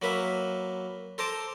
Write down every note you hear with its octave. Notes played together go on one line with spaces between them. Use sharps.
F#3 A#3 B4 E5
A4 C5 A#5 D6